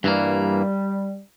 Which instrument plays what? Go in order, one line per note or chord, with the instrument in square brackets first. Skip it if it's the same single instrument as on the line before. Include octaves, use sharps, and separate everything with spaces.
[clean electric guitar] G2 E3 A#3 [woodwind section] G3